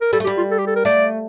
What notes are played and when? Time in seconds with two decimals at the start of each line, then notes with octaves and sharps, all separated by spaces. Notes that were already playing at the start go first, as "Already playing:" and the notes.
0.01 A#4
0.13 G3 A4
0.20 A3
0.25 G4
0.27 G3
0.37 F4
0.51 A4
0.59 G4
0.67 A4
0.76 A#4
0.85 A3 D5